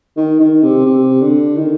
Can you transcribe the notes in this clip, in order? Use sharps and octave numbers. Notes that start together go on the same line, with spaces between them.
D#3
D#3
C3
C3
D3
D#3